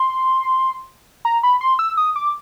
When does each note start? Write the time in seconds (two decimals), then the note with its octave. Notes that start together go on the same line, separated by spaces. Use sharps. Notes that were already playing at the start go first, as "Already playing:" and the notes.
Already playing: C6
1.25 A#5
1.43 B5
1.61 C6
1.79 E6
1.97 D#6
2.16 D6